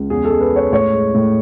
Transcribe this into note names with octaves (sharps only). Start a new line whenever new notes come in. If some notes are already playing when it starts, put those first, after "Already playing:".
Already playing: C#2
E2 G#4
A4
G#3
B4
G#3 C#5
A2 C#5
G#3
A2